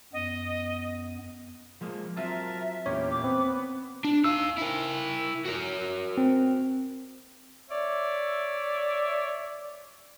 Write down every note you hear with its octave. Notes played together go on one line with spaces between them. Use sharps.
F#2 B3 D#5
F3 G#3 A#3
F#3 C4 F4 A#4 E5 A5
E2 A#2 C#4 G4 C#5
D6
B3 C4
D4
D#4 F5 E6
E4 A#4
F#4 A#4
C4
C#5 D5 E5